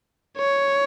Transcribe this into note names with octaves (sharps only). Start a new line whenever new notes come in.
C#5